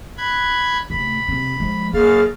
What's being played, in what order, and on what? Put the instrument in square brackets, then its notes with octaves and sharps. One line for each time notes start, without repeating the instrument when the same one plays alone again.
[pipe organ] B5 F#6 G#6
[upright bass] C3 A3 [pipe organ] B5
[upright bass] C3 C4
F3 G#3
[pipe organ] F#2 F5 A6 [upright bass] A#3 [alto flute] G#4